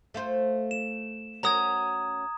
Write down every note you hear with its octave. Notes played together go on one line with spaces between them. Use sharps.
A3 F4 C5
E7
C#4 F#4 A#4 A#5 D#6 G#6